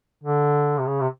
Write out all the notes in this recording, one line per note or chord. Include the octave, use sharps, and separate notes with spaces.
D3
C3
C#3
C3